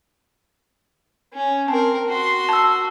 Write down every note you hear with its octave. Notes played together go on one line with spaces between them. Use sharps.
C#4
C4 A#4 A5
F#4 C6
A5 E6